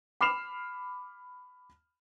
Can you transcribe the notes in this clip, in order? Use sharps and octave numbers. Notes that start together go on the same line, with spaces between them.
B5 D6 F6 C7 E7 F7